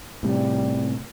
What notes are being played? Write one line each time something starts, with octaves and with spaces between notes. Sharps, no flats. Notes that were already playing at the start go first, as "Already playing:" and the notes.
A2 C3 G3